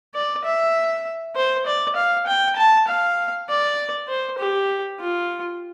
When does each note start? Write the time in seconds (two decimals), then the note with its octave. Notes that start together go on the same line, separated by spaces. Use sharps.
0.15 D5
0.44 E5
1.36 C5
1.66 D5
1.96 F5
2.27 G5
2.56 A5
2.88 F5
3.49 D5
4.08 C5
4.39 G4
4.99 F4